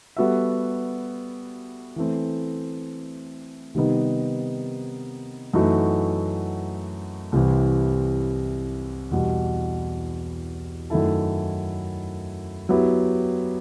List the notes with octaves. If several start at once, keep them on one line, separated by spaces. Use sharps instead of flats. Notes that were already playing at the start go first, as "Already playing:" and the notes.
G3 B3 F#4 A4 E5
E3 A3 C4
C3 D#3 G3 B3 D#4
F#2 E3 A3 D#4 F#4
C2 C3 E3
E2 B2 G3
F#2 D#3 A3 E4 A4
F#3 B3 E4 G4